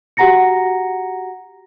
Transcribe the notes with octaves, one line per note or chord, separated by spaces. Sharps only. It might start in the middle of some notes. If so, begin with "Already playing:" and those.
F#4 G4 F#5 A#5 A#6 C#7